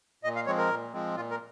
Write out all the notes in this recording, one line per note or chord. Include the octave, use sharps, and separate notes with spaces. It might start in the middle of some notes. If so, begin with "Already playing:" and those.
A#2 D#5
F5
F3 G#3 C4 C#5
A#4
A#2
F3 G#3 C4
A#2 F4
A#4